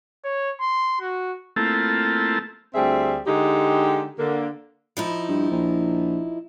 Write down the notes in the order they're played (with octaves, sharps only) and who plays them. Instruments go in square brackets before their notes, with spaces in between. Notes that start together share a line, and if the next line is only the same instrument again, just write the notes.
[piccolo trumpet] C#5
C6
F#4
[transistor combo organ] A3 A#3 C4 E4 F4 A4
[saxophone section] D2 G3 C4 G#4 E5
D3 G#3 D#4 G4
D3 A#3
[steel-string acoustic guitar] F3 D#4 E4
[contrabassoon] G2
A#1